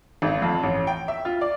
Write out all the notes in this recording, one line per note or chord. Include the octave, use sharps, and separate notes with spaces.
G#1
F2
A1
G5
E5
F4
D5